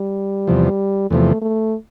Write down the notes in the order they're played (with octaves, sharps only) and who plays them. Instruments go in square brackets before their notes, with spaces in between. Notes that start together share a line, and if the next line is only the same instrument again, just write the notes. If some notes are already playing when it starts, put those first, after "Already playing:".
Already playing: [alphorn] G3
[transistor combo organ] E2 C3 F3
[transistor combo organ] E2 C3 F3 [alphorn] A3
[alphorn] A3